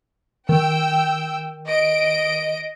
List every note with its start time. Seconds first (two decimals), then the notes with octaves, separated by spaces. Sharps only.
0.49 D#3 G5 E6
1.66 D#5 D7